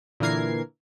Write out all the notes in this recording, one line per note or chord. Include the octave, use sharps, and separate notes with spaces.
A#2 D3 E3 A#4 G#6 C7